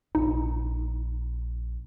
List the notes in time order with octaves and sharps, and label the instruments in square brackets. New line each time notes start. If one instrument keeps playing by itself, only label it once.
[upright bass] A#1 [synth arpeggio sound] D#4